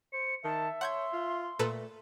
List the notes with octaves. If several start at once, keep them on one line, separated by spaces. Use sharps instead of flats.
C5 C#7
D#3 E5 A5
C#5 F#5 C6 G6 G#6
F4
A#2 A3 A4 B4